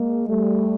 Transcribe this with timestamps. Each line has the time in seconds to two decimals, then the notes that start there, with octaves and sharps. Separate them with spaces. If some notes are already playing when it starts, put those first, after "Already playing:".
Already playing: G#3 A#3
0.27 G3 A3